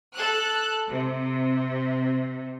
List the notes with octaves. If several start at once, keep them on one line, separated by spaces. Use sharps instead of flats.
A4 F#6
C3